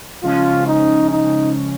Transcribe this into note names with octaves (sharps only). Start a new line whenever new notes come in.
C#3 F3 G#3 C#4 F4
D#4
D#4